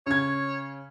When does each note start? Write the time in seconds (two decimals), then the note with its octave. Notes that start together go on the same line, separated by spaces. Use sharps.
0.07 C#3 C#5 G#6